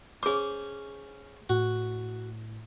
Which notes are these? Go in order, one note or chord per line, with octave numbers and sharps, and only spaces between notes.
C#4 G#4 C5 D6
A2 F#4